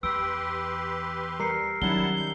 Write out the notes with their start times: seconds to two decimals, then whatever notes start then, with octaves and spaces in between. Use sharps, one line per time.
0.03 E2 G4 B4 C6 E6 D7
1.40 G3 A#4 A#5 C7 C#7
1.82 D#3 F#3 G3 C#4 E4 F#5 A5 G7
2.16 G6